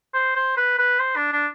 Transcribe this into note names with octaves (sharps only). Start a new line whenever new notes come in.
C5
C5
B4
B4
C5
D4
D4